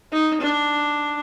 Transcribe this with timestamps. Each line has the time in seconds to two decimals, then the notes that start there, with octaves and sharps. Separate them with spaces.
0.13 D#4
0.41 D4